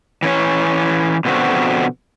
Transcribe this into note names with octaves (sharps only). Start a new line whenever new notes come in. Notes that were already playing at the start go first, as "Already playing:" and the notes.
E3 C#4 C#5
B2 D3 F3 B3 C4 F#4